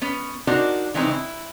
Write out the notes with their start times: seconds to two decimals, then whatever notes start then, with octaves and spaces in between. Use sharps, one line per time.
0.02 B3 C#4
0.47 D4 D#4 F#4 A#4 C5 D5
0.94 C#3 E3 G#3 C4 D#4
1.11 E4